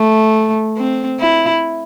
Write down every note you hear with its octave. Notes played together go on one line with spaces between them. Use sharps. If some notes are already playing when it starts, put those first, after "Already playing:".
Already playing: A3
C4
E4